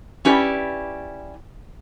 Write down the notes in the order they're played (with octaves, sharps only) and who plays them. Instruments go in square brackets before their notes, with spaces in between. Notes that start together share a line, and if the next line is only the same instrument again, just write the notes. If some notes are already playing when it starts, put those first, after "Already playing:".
[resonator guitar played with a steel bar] C#4 E4 G4 B4 D5